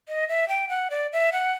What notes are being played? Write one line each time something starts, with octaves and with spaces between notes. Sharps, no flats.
D#5
E5
G5
F#5
D5
E5
F#5